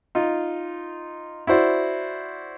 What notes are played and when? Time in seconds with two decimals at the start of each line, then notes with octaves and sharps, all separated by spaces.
0.15 D#4 F4
1.47 E4 F#4 C5 D5